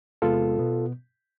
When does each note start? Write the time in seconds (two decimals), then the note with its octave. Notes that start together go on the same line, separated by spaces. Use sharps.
0.22 E2 C3 G#3 B3 F4 A4
0.58 B2 B3